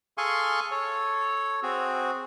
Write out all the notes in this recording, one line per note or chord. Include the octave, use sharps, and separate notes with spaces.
G#4 A4 F5 G#5 C6 C#6
A4 C#5
C4 F#4 G#4